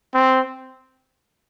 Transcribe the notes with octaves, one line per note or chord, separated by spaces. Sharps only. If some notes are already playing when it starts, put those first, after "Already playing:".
C4